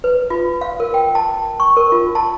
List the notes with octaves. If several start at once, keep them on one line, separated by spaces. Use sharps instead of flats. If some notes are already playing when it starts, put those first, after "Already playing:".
B4
F4
F5
A#4
G5
A5
C#6
A#4
F4
A5